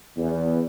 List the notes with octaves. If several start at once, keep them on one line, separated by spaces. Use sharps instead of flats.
E2